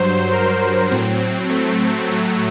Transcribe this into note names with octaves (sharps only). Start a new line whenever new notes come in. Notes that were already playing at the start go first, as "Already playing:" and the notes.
Already playing: G2 F#3 C5
A#4
A2 F#3 C4
C4
A3
A2 F#3